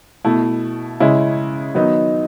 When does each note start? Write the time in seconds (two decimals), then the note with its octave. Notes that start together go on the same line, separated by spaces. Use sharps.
0.25 B2 A3 E4
1.00 C#3 G#3 C#4 E4
1.75 D#3 F#3 B3 D#4